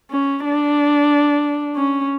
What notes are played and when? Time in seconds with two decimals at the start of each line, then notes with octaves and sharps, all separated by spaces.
0.11 C#4
0.45 D4
1.76 C#4